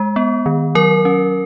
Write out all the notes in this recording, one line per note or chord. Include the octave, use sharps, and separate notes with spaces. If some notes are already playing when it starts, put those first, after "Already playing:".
Already playing: G#3
B3
D#3
F#3 A#4
C#4